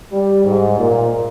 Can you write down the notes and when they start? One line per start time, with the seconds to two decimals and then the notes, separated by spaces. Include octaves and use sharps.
0.12 G3
0.44 G#2
0.78 A#2